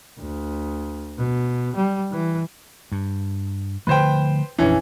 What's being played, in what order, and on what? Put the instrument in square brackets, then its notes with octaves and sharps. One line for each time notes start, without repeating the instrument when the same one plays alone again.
[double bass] D2
B2
G3
E3
[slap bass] G2
[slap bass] D3 F3 A3 [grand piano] B4 C5 G5
[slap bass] A#1 F2 D4 [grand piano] E3 C#4